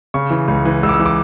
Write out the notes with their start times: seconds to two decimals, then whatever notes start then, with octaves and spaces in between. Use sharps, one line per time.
0.14 C#3 C#6
0.30 E3
0.48 C#2
0.65 E3
0.83 C#2 E6
0.89 D6
0.94 E6
0.99 E3
1.06 D6